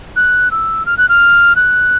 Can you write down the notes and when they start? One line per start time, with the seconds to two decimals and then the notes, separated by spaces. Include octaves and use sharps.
0.16 F#6
0.51 E6
0.86 F6
0.98 F#6
1.09 F6
1.56 F#6